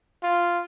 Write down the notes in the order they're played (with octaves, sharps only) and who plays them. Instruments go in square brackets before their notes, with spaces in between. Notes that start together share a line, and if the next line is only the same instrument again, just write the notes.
[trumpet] F4